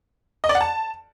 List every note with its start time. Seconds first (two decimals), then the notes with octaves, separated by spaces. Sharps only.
0.44 D#5
0.49 D5
0.55 F#5
0.61 A5